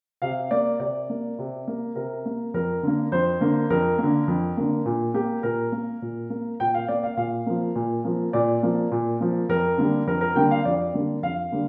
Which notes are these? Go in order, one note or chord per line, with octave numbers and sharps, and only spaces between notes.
C3 F5
A#3 D5
C3 D5
A#3
C3
A#3
C3 A#4
A#3
F2 A#4
D3 A#3
F2 C5
D3 A#3
F2 A#4
D3 A#3
F2
D3 A#3
A#2
A#3 G4
A#2 A#4
A#3
A#2
A#3
A#2 G5
F5
A#3 D5
F5
A#2 F5
F3 A#3
A#2
F3 A#3
A#2 D5
F3 A#3
A#2
F3 A#3
F2 A#4
D3 G3 A#3
F2 A#4
A#4
D3 G3 A#3 G5
F5
F2 D5
D3 G3 A#3
F2 F5
D3 G3 A#3